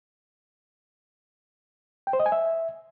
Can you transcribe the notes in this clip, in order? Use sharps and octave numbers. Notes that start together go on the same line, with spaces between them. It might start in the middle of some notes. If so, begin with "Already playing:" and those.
G5
C5
D#5
G#5
E5